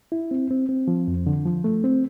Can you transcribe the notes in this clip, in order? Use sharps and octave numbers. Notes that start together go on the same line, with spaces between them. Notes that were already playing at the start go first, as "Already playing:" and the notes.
E4
C4
C4
C4
F3
F2
D3
F3
A3
C4